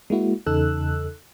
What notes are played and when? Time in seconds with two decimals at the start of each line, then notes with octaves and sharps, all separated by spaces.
0.10 G#3 A#3 E4 F#4
0.46 E2 C#3 D#4 A4 E6 F#6